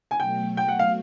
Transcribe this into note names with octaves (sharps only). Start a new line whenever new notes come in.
G#5
B2 F#3 A3 G5
G5
F#5
F5